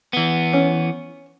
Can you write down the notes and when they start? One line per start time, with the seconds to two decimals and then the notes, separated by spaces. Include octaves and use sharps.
0.13 E3 B3
0.53 C#4